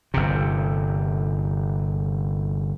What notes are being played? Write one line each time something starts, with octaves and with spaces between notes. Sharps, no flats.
G1 C3